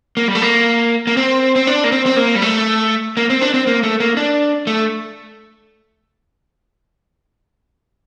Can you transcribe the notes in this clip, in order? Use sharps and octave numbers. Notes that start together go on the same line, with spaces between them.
A#3
G3
A3
A#3
A#3
C4
C4
D4
A#3
C4
C4
A#3
G3
A3
A#3
C4
D4
C4
A#3
A3
A#3
D4
A3